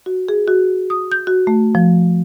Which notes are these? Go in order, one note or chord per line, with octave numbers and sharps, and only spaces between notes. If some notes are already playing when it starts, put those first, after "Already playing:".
F#4
G#4
F#4
D#6
G6
F#4
A3
F3